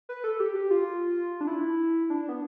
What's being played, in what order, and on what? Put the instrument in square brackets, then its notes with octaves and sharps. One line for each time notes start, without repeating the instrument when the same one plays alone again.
[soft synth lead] B4
A4
G4
G4
F4
D4
E4
D4
B3